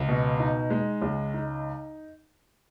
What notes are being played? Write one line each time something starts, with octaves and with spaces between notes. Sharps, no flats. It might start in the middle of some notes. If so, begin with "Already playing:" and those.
Already playing: C#2
B2
D#4
G#3
C#2
D#4